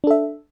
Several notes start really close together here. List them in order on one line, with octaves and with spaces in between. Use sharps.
D4 A4 E5